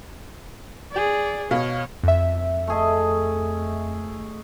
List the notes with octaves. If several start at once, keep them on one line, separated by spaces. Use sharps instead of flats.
G#4 D5
B2 C#5 F5
F2 E5
A3 G#4 D#5